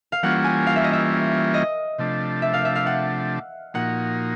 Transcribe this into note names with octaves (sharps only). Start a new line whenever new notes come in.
F5
E3 G3 A#3 C#4 F4 F#5
G#5
F5
E5
D#5
E5
D#5
C3 F3 A3 D4
E5
F5
E5
F5
F#5
A#2 F3 A#3 D#4 F#4 F#5